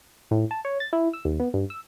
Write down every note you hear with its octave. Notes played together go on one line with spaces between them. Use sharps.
A2
A5
C#5
A6
E4
E6
D#2
B3
G2
E6